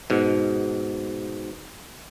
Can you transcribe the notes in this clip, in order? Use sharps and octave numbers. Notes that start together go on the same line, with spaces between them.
G#2 B2